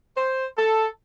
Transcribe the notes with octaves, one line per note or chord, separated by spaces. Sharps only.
C5
A4